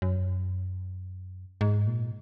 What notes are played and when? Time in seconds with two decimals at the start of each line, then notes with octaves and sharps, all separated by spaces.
0.02 F#2
1.61 G#2
1.87 A#2